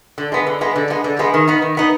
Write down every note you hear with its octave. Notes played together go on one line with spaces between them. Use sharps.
D3
G#3 B3
D3
G#3 B3
D3
G#3 B3
D3
G#3 B3
D#3
B3 D#4
D#3
B3 D#4